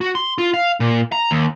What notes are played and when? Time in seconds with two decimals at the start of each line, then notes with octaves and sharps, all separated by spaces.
0.01 F#4
0.15 C6
0.38 F4
0.54 F5
0.80 A#2
1.12 A#5
1.31 D#2